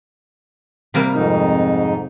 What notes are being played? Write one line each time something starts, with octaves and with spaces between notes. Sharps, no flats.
C3 G3 A#3
F2 G#2 D#4